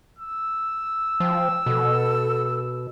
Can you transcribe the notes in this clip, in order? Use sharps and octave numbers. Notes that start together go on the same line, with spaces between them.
E6
F3 G5
B2 A4